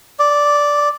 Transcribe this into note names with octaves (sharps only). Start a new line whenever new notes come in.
D5